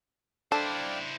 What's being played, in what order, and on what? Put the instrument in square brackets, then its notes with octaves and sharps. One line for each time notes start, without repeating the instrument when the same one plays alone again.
[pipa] D4 [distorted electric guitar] E4 C5 [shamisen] A4 [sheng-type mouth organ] D5 F5 G5